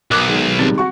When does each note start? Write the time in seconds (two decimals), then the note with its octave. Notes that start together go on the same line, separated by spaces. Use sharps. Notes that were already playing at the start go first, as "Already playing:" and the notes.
0.11 B1 A#4 D6 F#6
0.27 D#3 G#3
0.59 D#3 G3 G#3 C4
0.78 F#4 C#6